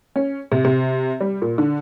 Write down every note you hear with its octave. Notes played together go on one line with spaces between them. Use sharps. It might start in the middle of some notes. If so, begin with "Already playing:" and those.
C#4
C3
C3
G3
A#2
D3